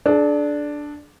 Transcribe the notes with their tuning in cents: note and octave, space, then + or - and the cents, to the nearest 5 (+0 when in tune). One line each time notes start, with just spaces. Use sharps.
D4 +0 G#4 +45